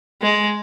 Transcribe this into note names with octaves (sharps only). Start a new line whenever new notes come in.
G#3